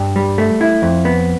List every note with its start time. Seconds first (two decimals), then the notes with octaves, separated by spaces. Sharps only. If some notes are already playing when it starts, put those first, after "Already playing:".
Already playing: G2
0.16 G3
0.38 A3
0.61 E4
0.82 F2
1.05 B3